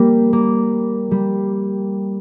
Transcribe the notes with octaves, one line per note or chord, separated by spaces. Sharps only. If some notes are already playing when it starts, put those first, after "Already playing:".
Already playing: G3 A#3
A#3
G3